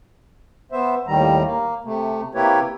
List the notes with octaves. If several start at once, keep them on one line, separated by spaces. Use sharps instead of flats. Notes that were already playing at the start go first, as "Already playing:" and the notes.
B3 C5 E5
D#2 A2 D#3 G3 A#5
A#3
C3 A3
C3 A#3 E4 G4 B4 C#5